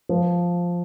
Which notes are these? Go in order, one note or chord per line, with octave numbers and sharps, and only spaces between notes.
F3